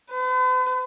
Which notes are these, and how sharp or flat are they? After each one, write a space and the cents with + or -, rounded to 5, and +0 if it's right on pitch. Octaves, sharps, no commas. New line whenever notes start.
B4 +45